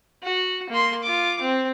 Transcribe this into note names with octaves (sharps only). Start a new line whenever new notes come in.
F#4
A#3 C6
F4 D6
C4